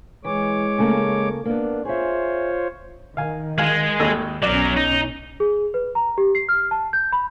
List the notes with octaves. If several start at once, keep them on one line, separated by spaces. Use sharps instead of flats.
E3 G#3 C#5 D6
C#3 A3 A#3
A#3 B3 D4
F4 G#4 C5 C#5 E5
D#3 F5 G#5
G#3 G#4 F5 G#5
G#1 D#2 A4
B1 F#3 C#4 A#4 D5
D#4
G#4
B4
A#5
G4
C7
F6
A5
G6
B5